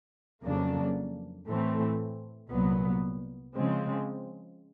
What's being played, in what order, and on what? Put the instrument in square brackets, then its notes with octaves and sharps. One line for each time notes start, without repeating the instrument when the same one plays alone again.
[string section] F2 C#3 F#3 A#3 D4
A2 E3 A3 C4
C2 A#2 F#3 B3
C#3 F3 G#3 C4